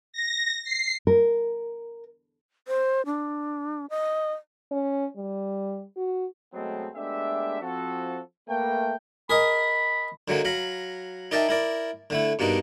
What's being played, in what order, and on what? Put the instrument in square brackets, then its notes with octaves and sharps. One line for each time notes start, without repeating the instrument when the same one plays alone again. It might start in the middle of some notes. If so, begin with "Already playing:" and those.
[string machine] A#6
C7
[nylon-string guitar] A#4
[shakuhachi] C5
D4
D#5
[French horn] C#4
G3
F#4
[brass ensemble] B2 F#3 G#3 A3 B3 C4
G#3 A3 B3 D4 G4 E5
F3 C4 F#4 A4
A3 A#3 B4 G5
[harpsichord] G#4 A#4 D#5 [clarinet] B5
[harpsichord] D3 F#3 G#3 A#3
F#3 F5 A#5 B5
D#4 A#4 D5 E5 G5 A5
E4 A#4 D5
D3 A3 E4
G2 B2 A#3 D4 D#4